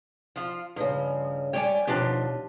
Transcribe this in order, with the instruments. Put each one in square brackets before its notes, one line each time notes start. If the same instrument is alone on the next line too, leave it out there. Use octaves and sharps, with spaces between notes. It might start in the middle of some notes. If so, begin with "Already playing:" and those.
[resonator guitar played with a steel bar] F3 F4
[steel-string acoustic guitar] G2 C#3 [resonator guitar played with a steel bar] F3
[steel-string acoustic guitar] G3 G4 G5 [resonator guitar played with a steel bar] C#5 D5 G#5
[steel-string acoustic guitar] D#2 B2 F3 [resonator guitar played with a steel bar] D4 F4 G4